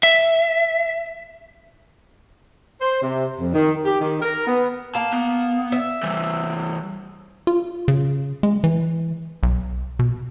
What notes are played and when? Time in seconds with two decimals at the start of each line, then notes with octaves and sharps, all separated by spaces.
0.03 E5
2.81 C5
3.02 C3
3.40 F2
3.54 D#3
3.85 G4
4.01 D#3
4.22 A#4
4.47 B3
4.95 A#3 A5
5.13 B3
5.72 E5
6.03 E3 G3
7.47 F4
7.88 C#3
8.43 G#3
8.64 E3
9.43 B1
9.99 B2